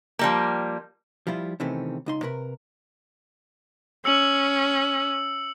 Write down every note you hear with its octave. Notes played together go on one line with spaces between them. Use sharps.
F3 G3 A#3
F3 G3 E4 F4
C3 D#3 E3 A3 C4 C#4
C#2 D#4 C6
C3 A#4 B4
C#4 E6 C#7 F#7